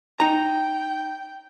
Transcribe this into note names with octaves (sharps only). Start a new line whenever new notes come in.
D#4 G5 A#5